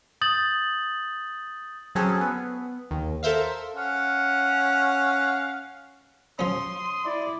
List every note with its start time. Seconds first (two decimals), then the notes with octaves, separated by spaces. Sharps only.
0.21 D#6 G6 A6 F#7
1.95 F#3 C4 C#4 G#4 A4
2.21 B3
2.91 D#2
3.23 A4 A#4 C5 E5 F5
3.76 C#4 F5 F#5
6.39 F3 C#4 C6 D#6
7.05 E4 D5